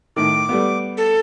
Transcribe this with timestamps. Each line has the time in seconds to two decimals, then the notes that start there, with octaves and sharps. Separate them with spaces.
0.16 A2 D#3 D6
0.49 G3 A3 B3
0.97 A4